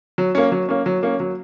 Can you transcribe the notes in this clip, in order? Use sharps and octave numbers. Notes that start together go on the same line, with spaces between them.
F#3
A#3 C#4
F#3
A#3 C#4
F#3
A#3 C#4
F#3